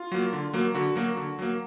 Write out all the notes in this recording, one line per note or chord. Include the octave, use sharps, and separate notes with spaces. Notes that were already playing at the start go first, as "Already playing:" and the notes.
Already playing: F4
F#3 A#3
D3
F#3 A#3
D3 F#4
F#3 A#3
D3
F#3 A#3